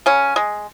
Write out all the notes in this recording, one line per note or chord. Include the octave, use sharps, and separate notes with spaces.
C#3 C#4
G#3